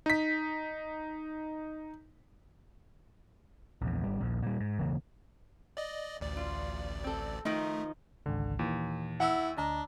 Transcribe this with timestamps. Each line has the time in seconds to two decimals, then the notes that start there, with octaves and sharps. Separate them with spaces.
0.06 D#4 B6
3.82 A#1 E2
4.03 G#1 G3
4.20 D#1 A#1
4.42 A#2 G3
4.60 G#2
4.79 E1 C#3 E3 A#3
5.77 D5 D#5
6.21 A1 D2 D5
6.37 F4
7.04 C4 A4
7.45 D#3 F3 A3 D#4
8.26 G#1 C#2 D3
8.59 D#2 A#2 E3
9.20 E4 F#5 E6
9.57 D2 D4 D#5 A5 A#5